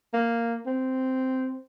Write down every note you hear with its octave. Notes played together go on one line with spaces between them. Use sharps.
A#3
C4